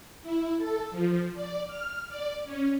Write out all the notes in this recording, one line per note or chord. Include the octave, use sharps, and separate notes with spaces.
E4
A4
F3
D5
F6
D5
C#4